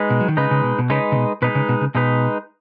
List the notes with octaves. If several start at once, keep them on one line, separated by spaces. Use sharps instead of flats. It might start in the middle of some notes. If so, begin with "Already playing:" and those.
Already playing: G#3 D#4 B4
B2
F#3
D#3
C#3 G#3 D#4 B4
C#3
B2
B2
C#3 G#3 D#4 B4
C#3
B2
B2 G#3 D#4 B4
C#3
B2
C#3
B2 G#3 D#4 B4